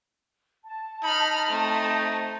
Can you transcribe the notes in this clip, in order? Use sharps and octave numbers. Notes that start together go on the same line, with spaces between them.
A5
D#4 B5 F6
A3 C4